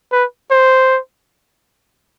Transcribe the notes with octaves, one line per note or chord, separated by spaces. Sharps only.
B4
C5